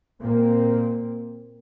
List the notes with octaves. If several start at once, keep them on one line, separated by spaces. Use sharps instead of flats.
A#2 A#3 C4